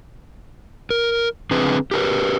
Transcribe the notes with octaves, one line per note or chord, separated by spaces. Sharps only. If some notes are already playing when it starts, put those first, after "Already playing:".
A#4
D3 C4 G#4 B4
G4 A#4 B4